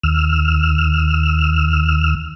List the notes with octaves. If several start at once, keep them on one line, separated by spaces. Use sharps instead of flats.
D#2 E6 F6